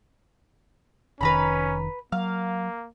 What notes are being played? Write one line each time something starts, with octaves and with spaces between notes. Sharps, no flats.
F1 D#3 C#4 B4 A#5 B5
F#3 A#3 F5